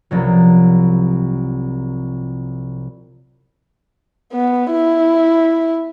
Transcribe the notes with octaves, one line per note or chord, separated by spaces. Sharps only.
C2 F3 F#3
B3
E4